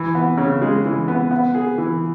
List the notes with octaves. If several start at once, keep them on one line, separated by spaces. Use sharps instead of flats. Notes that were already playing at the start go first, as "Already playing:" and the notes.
Already playing: E3
B3
C#3
G#3
E3
B3
B3
G#4
E3